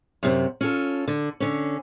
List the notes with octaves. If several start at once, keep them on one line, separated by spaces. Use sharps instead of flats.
F#2 C3
C#4 F4 A4
D3
D3 C#4